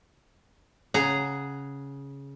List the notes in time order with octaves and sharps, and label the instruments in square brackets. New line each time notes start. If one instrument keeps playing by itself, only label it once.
[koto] C#3 G#4 F#5 A#5